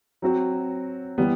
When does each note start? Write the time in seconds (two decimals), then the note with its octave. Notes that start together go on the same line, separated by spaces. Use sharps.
0.22 F#3 C4 F#4
1.18 E3 G3 B3